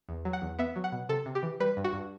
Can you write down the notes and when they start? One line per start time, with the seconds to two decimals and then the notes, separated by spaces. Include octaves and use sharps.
0.09 E2
0.25 F#3
0.33 F#5
0.42 E2
0.59 B3 E5
0.76 F#3
0.84 F#5
0.92 B2
1.09 C3 A4
1.26 C3
1.35 G4
1.43 E3
1.60 G3 B4
1.77 G2
1.84 F#4
1.93 G2